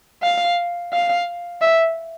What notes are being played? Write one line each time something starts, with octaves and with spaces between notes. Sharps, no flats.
F5
F5
E5